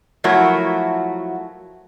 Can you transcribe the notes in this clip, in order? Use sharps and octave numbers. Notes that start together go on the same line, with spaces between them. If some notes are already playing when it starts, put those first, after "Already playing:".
F3 F#3 A3 E4 F#4 A#4